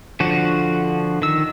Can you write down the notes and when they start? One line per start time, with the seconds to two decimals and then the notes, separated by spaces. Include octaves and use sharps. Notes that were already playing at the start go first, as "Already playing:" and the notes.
0.20 D3 F3 F#4
1.22 D#3 E6